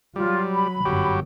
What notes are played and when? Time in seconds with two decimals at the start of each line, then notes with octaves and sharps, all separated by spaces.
0.16 F#3 G3 F4
0.52 B5
0.85 G1 F#2 F#3 G4